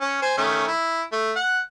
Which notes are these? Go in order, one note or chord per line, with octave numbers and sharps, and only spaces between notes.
C#4
C5 G#5
D#3 A3 C#4
E4
A3
F#5